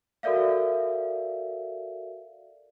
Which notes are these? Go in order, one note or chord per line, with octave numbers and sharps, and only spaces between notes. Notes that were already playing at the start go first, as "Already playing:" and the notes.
F#4 A4 A#4 D5 E5 F5